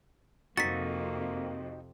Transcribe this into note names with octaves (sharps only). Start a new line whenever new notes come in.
F2 C3 A#3 C4 D#4 F#4 A6 B6